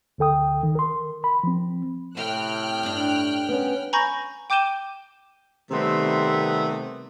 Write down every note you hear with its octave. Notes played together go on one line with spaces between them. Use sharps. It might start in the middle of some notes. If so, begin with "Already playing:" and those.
D2 D3 A4 G5 D#6
D#3
A#4 C6
B5
F3 C4
A2 C3 G5 F6 F#6
G2 D4
B3 C#4
G#5 A#5 B5 C#6 G6 A#6
G5 D6 G6 D#7 E7 G7
C3 D#3 G3 A3 B3 C4